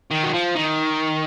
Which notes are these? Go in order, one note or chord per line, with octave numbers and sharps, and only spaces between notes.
D#3
F#3
F3
D#3